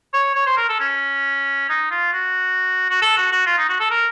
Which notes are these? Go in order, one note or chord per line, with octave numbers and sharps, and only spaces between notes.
C#5
C#5
C5
A#4
A4
C#4
D#4
F4
F#4
F#4
A4
F#4
F#4
F4
D#4
F#4
A4
A#4